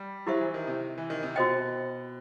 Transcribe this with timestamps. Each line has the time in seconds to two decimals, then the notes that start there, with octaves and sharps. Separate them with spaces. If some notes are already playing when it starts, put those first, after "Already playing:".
Already playing: G3
0.27 F#3 E4 G4 C5 E5
0.41 E3
0.54 D#3
0.67 C3
0.98 E3
1.10 D#3
1.23 C3
1.35 B2 F#4 C5 D#5 G5